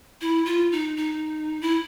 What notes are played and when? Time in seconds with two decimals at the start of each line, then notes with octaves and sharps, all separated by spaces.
0.21 E4
0.46 F4
0.72 D#4
0.97 D#4
1.61 E4